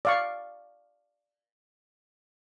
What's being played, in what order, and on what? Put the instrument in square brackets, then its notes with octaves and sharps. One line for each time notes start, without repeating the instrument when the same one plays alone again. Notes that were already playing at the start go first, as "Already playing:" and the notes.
[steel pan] D5 F5 C#6